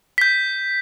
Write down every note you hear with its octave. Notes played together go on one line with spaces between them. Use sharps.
G6 B6